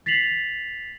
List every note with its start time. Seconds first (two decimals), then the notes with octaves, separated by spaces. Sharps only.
0.06 A6 B6 C7 F7 F#7